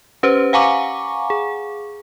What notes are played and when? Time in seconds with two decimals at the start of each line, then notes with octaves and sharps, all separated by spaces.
0.23 C#4 G4 B4 C5
0.53 F5 F#5 G#5 A#5 C#6 D6
1.30 G#4